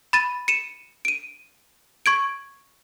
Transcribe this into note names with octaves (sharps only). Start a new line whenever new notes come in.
B5 A6 D#7
C#7 D#7 E7
D7 D#7
C#6 G#6 D7